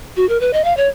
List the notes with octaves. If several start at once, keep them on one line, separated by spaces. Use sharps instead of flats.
F#4
A#4
B4
D#5
F5
C#5